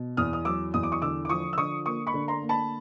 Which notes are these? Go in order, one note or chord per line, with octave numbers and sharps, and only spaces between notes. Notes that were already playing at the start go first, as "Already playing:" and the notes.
Already playing: B2
E2 D#6 F6
D#6
F#3 D6 E6
E2 D#6
D6
C#6 D#6
D3 D6 E6
D6
F3 C#6 D#6
E6
D3 C#6 D#6
A#3 C#6 D#6
B5 C#6
D3
A#5 C6
A#3
A5 B5